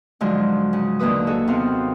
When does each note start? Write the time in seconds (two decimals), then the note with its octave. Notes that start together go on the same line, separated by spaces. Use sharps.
0.21 G#2 D3 F3 F#3 G#3
0.73 C#3
0.99 D#2 D3 A#3 B4 D#6
1.27 D#4 F#4 G#4 A4
1.48 C3 B3 C4 F5